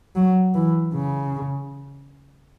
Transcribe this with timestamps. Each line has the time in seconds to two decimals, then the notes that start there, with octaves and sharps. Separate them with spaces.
0.15 F#3
0.55 E3
0.94 C#3